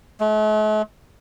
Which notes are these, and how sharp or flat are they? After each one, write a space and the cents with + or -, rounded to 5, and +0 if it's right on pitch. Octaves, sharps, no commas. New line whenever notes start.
A3 -45